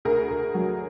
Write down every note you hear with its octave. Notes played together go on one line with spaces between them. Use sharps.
D2 G#4 A#4
D2
F#3